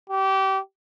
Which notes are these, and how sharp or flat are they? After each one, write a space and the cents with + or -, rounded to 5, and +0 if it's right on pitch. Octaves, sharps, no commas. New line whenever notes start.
G4 -25